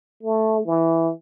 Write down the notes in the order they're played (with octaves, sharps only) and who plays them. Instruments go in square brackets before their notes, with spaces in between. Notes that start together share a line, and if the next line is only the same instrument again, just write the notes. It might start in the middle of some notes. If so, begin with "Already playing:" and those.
[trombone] A3
E3